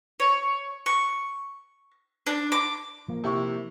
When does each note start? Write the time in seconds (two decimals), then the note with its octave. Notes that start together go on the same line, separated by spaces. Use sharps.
0.20 C#5
0.86 C#6
2.27 D4
2.52 D6
3.08 F3 A#3
3.24 C3 E4 C#6